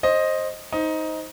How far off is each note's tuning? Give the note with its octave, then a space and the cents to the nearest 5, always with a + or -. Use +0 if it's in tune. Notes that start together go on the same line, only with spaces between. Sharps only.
C5 +20 D#5 +0
D#4 +15 C5 +5